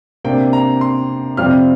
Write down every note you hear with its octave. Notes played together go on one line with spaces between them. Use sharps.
C3 A#3 D4 G5
A#5
C6
F2 C3 G3 C4 F4 F6